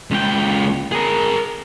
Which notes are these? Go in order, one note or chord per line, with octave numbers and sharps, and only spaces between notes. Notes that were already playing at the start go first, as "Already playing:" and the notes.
C#2 G5
G#4 A#4